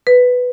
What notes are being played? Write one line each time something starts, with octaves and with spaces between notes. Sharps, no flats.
B4